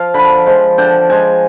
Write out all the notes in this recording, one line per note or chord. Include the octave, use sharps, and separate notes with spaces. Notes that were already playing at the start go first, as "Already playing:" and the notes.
Already playing: F3 F5
D3 B5
F3 G#3
D3 G5
F3 G#3 G#5